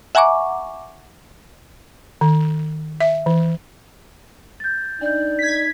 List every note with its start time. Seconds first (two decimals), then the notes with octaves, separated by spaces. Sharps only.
0.15 E5 F#5 G#5 A#5 C#6 D6
2.21 D#3
3.00 E5
3.26 E3
4.60 G6 A6
5.01 D4 D#4 D5 G6
5.39 G#6 B6